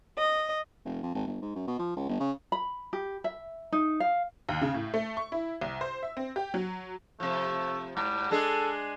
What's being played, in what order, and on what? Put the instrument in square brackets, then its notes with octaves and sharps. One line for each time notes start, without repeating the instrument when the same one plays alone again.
[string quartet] D#5
[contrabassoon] F1
F2
G#1
G1
G#2
F#2
B2
F3
C#2
G1
C#3
[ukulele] B5
G4
E5
D#4
F5
[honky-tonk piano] D#2
C#3
A2
A3
C#6
E4
C2
C5
E5
C4
G4
F#3
[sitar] C3 F3 [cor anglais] A3
[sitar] G#2 [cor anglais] G3
[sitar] G#3 D4 G#4 [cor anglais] A4